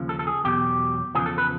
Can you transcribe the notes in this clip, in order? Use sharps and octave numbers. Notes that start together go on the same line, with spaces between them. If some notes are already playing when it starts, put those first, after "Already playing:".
Already playing: D#2 C#3 F3
A4
A4
G#4
E2 B2 F#3 G4
E2 C#3 F3 G#4
A4
B4